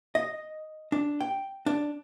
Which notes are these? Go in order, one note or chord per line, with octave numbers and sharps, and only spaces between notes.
D#5
D4
G5
D4